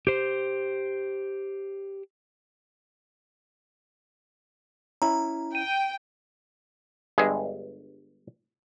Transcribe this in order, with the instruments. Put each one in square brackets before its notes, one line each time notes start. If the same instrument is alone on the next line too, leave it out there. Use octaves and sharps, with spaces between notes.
[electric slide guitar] G4 C5
[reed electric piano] C#4 E4 [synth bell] A#5
[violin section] G5 [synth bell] D#7
[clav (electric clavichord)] G1 G2 G#3 G#4 E5